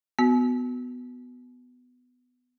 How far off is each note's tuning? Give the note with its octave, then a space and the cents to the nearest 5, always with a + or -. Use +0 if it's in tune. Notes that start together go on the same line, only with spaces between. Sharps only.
B3 +10 F#4 +0